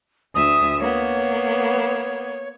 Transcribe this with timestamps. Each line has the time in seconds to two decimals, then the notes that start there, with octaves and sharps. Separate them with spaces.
0.35 D2 E5 D#6
0.80 A#3 B3 C#5